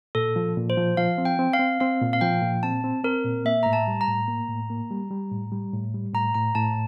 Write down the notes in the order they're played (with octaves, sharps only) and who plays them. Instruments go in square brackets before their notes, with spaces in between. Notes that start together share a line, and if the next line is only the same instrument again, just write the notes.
[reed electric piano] A#2 [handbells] A4
[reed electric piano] F3
A#2
[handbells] C5
[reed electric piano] F3
[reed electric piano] F3 [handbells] F5
[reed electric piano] C4
[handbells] G5
[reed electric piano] C4
[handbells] F5
[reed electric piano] C4
[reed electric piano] C4 [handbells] F5
[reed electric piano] A#2
[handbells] F5
[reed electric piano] F3 [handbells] G5
[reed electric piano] A#2
[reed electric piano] C4 [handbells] A5
[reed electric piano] C4
[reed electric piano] C4 [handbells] A#4
[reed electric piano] A#2
[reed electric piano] A#3 [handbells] E5
[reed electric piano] A2 [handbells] A#5
[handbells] A5
[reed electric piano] G3
[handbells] A#5
[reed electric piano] A2
A#3
A2
A#3
G3
G3
A2
G3
A2
G3
[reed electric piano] A2 [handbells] A#5
[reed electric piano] A2 [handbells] A#5
[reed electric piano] A2 [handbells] A5